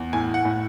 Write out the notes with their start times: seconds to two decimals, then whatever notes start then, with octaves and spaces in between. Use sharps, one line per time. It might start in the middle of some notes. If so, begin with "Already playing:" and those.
Already playing: E2
0.13 A2 G#5
0.34 F#5
0.45 A2